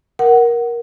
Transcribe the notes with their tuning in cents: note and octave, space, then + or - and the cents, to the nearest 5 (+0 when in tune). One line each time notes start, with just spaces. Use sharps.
A#4 +15 F#5 +10